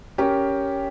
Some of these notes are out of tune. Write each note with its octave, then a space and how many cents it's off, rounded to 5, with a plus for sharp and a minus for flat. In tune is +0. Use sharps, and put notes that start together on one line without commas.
C#4 +10 G4 +0 A#4 +5